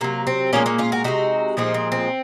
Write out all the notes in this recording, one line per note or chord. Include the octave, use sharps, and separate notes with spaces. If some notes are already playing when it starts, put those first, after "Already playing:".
C3 F#3 A#3
C4
A#2 F3 G#3 A#3 C#4
A#3 C#4
C#4 F4
F#4 A#4
C3 D#3 G#3 D#4 F#4
A#2 F3 G#3 C4 D#4
C4
C4